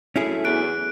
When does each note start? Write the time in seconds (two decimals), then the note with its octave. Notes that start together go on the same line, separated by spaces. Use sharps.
0.16 F#3 A3 C#4 E4 G#4
0.44 E2 F#6 D7